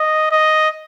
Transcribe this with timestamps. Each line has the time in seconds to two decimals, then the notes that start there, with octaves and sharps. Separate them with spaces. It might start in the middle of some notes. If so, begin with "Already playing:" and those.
Already playing: D#5
0.31 D#5